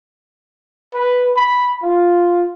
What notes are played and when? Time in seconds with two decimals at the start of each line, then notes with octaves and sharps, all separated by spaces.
0.94 B4
1.37 B5
1.83 F4